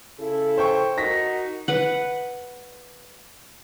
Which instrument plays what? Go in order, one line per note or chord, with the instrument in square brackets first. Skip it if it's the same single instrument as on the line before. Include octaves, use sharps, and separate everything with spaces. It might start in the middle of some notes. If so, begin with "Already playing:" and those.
[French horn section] C#3 E4 A4
[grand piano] C5 G5 C#6
[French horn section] D#4 F#4 A#4 [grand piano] A#6 B6
[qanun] B4 F#5